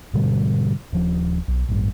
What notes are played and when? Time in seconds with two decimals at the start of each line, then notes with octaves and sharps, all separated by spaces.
0.13 G#2 B2 D3 G3
0.93 D#1 F3
1.48 B1
1.69 A1 G2